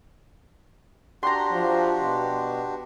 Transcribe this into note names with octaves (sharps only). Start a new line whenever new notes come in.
D4 F#4 G4 A#5 C6
F3
B2